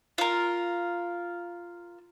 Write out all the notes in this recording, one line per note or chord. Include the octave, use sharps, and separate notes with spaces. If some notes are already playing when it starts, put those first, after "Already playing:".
F4 A#4